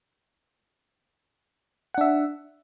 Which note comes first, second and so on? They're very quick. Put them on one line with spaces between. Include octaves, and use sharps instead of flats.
F#5 D4 E5